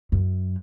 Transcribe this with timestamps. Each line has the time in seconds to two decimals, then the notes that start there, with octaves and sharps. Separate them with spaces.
0.12 F#2